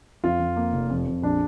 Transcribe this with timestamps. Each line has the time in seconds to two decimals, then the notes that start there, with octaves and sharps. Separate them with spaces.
0.24 F2 F4
0.40 F2
0.56 A#3
0.73 F1
0.90 F2
1.06 F2
1.22 A#1 D4